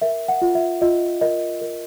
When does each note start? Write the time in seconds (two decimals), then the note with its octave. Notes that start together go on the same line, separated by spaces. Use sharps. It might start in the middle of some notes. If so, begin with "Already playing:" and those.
0.02 A#4 E5
0.28 F#5
0.42 F4
0.55 E5
0.81 F4 D#5
1.21 A#4 D#5
1.61 A#4